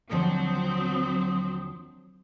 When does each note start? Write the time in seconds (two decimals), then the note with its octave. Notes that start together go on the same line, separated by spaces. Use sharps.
0.11 D#2 D3 F3 F#3 C4 D#6